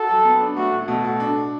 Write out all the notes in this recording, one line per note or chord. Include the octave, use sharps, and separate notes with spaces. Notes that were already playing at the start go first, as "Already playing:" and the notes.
Already playing: F#4 A4
F#3
B3
D4
A3 F#4
A2
B2 A4
F#4
D4